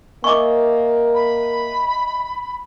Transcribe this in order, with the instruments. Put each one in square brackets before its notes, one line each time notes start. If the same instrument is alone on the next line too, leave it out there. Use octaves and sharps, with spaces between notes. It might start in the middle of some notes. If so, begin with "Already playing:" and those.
[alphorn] A#3 [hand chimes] D#5 E5 G#5 [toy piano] C#6 D6
[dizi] B5